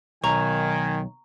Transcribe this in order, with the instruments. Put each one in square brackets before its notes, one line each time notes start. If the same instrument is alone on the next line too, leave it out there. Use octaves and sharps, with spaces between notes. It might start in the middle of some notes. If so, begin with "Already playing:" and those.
[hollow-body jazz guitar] B1 [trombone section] D#3 [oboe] G#5 [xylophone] A#5 C#6